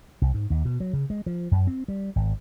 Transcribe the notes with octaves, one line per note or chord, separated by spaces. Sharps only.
C2
G#2
D#2
B2
F#3
C#3
G#3
F3
F#2
C4
G3
G#1